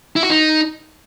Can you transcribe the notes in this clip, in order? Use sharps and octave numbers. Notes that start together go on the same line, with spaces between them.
E4
F#4
D#4